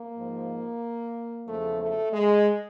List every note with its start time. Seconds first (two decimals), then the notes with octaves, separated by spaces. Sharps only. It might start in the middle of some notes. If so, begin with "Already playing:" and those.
Already playing: A#3
0.15 G#2 F3
1.47 E2 C#3 F3 A3
1.81 A3
2.13 G#3